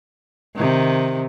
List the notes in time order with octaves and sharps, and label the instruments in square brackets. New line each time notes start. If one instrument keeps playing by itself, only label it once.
[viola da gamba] C3 D#3